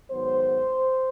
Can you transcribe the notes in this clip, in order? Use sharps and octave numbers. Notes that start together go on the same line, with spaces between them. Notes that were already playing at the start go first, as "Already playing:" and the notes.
G#2 D#3 F#3 B3 C5